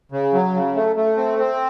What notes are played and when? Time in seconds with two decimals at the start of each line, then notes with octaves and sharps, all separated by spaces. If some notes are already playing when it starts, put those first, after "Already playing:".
0.12 C#3
0.33 F#3
0.54 C#3
0.75 A3
0.96 A3
1.17 C4
1.38 C4